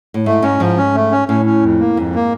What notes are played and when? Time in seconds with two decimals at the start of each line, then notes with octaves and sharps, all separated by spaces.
0.14 A2
0.26 G#2 A3
0.42 G#2 C#4
0.60 G#2 F3
0.77 C#4
0.95 A3
1.11 C#4
1.28 A2 C#4
1.46 C#4
1.63 F2
1.79 A#3
1.96 F2 G#2
2.15 A#3